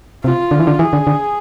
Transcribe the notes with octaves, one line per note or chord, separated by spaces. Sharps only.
C3 F4
D3
E3
D3
E3 G#4
D3
D3